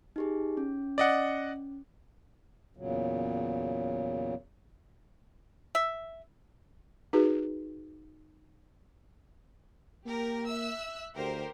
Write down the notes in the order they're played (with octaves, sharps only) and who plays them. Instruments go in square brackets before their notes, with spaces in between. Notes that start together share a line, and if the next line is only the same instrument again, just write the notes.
[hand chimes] D#4 G4 G#4
C#4
[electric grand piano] D5 D#5 F#5
[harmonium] E2 A#2 C#3 F#3
[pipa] E5
[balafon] D#4 F#4 G#4 B4
[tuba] A#3 [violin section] G4 A#4
[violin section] E5 E6 F#6
[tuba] D2 [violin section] G4 A#4 C5